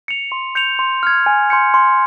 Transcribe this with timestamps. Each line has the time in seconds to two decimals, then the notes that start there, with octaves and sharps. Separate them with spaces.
0.08 C#7 F7
0.32 C6
0.55 G6 C#7 F7
0.79 C6
1.03 F6 G#6
1.26 G#5
1.50 C6 G6 C#7
1.74 C6